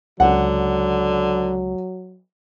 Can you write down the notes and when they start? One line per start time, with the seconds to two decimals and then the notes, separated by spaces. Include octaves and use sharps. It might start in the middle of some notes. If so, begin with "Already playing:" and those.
0.20 C#2 D3 F#3 F#5